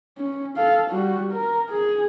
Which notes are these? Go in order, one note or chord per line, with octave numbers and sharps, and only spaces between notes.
C#4
A4 F5
G3 F#4
A#4
G#4